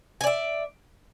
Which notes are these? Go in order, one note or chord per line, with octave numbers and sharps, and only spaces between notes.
D5 E5 G#5